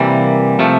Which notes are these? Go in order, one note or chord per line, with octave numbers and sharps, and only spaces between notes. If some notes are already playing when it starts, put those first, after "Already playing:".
Already playing: C3 E3 G3 A#3
C3 F3 A3